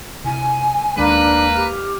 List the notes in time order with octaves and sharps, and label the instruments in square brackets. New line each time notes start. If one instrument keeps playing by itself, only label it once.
[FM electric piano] C3 E4 [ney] G#5
[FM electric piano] D#2 D#3 G#3 [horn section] A#3 B4 [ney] D4
[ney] G4 [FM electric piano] F6